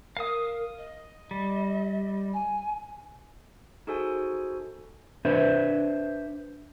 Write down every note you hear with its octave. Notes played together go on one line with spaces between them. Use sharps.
A#4 F5 D#6
D#5
G3
G#5
D#4 F#4 G#4 A4 C5 G#5
D4 B4 C5 E5